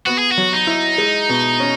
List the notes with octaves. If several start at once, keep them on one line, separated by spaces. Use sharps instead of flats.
B3 F#4
G#4
F#4
F#3
D#4
E4
G#3
B2
C#4